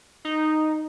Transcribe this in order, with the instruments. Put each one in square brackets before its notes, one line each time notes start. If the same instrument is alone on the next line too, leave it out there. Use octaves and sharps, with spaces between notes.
[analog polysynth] D#4